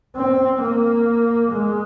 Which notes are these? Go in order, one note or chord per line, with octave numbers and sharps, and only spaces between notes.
C4
A#3
G#3